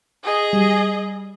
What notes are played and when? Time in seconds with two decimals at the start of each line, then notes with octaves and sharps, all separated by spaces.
0.23 G#4 D#5
0.53 G3